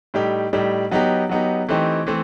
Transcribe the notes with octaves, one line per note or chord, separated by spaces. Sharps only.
A2 G3 D#4 G4
A2 G3 D#4 G4
F#3 B3 D#4 G4
F#3 B3 D#4 G4
E3 A3 C4 D#4 G4
E3 A3 C4